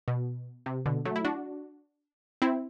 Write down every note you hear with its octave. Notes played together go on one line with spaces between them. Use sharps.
B2
C3
B2 D3
F#3 A3
E4
D4 F#4
C4 E4